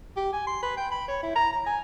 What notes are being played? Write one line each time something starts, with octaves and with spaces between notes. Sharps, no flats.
G4
G#5
C6
B4
G5
B5
C#5
E4
A#5
A#5
G#5